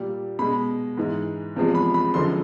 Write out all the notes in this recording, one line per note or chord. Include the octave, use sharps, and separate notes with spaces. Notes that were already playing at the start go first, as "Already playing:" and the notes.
Already playing: A#2 G3
B2 G#3 B5
G#2 E3 G#3
E2 C3 F3 G#3
B5
B5
F#2 D3 F3 G#3 C6